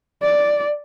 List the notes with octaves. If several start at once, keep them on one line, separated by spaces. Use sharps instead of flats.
D5